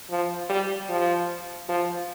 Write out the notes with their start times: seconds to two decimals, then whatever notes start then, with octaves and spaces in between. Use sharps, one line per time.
0.10 F3
0.50 G3
0.89 F3
1.69 F3